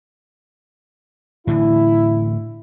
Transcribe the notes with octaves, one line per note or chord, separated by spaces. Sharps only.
A2 D3 E3 E4